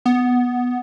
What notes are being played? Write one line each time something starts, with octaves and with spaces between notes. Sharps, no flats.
B3